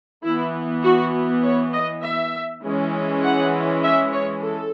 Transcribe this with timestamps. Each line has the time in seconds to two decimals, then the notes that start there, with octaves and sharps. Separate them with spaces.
0.23 E3 B3 E4
0.83 F#4
1.43 C#5
1.73 D#5
2.03 E5
2.63 E3 G#3 C#4
3.23 F#5
3.83 E5
4.13 C#5
4.42 A4